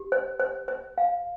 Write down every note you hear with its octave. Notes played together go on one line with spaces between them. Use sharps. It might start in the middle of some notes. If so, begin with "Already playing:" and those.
Already playing: G4
C5
C5
C5
F5